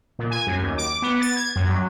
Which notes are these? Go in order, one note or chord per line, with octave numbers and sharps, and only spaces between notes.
A#2
G#5
F#2
D#2
D6
B3
A6
G#6
F#2
F#3